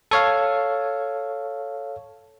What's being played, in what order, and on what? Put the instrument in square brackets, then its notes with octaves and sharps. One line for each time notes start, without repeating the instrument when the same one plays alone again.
[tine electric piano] A4 C#5 F5